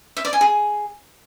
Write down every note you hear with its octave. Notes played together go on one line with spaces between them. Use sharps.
E5
D5
G#5
G#4